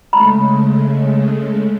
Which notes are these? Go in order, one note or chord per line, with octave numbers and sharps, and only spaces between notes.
C#3 G#3 A3 A#5 B5